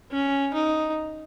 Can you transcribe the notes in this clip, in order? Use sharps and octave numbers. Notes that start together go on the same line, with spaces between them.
C#4
D#4